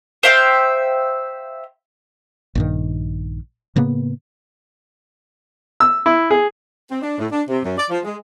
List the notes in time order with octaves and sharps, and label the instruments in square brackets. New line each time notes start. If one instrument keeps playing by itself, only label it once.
[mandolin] C5 E5 F5 G5
[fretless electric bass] A#1 G2 D#3
A2 C#3 A#3 B3
[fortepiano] E6
E4
G#4
[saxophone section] C4
D4
A2
D4
C3
F#2
D5
F3
G#3